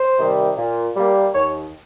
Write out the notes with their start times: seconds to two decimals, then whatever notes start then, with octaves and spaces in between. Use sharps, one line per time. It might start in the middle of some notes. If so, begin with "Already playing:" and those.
Already playing: C5
0.18 C3 D#3 G3
0.56 A#2
0.96 G3 A#3
1.34 D#2 C#5